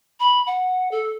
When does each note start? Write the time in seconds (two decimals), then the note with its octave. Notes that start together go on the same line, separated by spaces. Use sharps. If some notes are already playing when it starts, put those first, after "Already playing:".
0.20 B5
0.47 F#5
0.91 A4